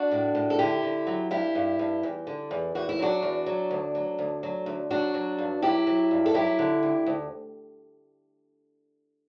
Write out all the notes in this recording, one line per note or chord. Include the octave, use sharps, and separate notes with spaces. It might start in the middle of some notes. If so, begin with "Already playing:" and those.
Already playing: D4 F#4
A2
A2
A4
D3 E4 G4
D3
F#3
G2 E4 G4
G2
G2
E2
D3
E2
E2 F#4
E4
F#3 D4 F#4
E2
F#3
D2
F#3
D2
F#3
D2
F#3 D4 F#4
F#3
G2
F#3 E4 G4
F#3
G2
A4
F#3 E4 G4
D3
D2
D2